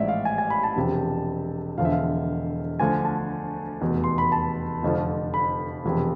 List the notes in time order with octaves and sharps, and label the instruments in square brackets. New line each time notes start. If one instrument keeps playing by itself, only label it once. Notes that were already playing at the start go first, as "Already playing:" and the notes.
Already playing: [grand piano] A1 G#2 F3 D5 E5
F5
G#5
G#5
B5
A5
E1 E2 C3 F3
E1 E2 D3 F3 F5
E5
F5
D2 D3 F3 G#5
A5
F1 E2 B2
C6
B5
A5
F1 F2 D3 F3
B5
E1 E2 C3 F3